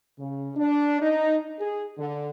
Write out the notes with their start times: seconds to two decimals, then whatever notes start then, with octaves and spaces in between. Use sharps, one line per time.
0.19 C#3
0.56 D4
1.00 D#4
1.60 G#4
1.98 D3